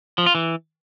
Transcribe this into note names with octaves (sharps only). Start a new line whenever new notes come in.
F3
F4
E3